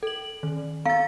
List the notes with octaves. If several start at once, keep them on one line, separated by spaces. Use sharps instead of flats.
A4 F#7
D#3
B3 F5 A6